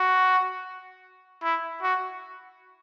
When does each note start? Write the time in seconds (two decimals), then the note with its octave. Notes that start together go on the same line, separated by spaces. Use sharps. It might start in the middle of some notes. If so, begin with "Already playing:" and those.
Already playing: F#4
1.43 E4
1.82 F#4